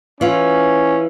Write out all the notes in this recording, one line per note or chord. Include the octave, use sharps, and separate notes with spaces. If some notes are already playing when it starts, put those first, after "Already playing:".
E3 C#4 F4